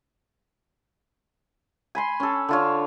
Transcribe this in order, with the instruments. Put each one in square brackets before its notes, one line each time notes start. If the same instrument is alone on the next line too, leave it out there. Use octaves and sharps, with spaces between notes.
[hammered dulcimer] G#5 B5 C6
C#4 A4
D3 F4 C#5